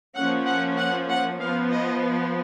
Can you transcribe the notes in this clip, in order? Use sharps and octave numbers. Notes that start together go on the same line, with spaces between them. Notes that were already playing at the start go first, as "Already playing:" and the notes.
F3 A#3 C#4 F#5
F#5
F#5
F#5
F3 B3 F5
D#5